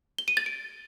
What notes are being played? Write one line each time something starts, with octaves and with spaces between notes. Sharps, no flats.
G7
D#7
A6
D7